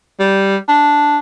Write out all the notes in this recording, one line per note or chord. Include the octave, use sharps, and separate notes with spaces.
G3
D4